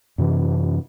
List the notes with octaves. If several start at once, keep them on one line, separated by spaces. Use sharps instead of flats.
F#2 C3 E3